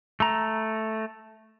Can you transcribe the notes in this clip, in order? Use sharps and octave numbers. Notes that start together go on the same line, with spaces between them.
A3 A#5